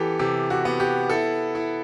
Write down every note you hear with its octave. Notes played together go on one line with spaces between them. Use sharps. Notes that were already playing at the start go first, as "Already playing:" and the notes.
Already playing: E3 B3 G4 A4
C3 G4
F#4
B3
G4
E4 A4
E4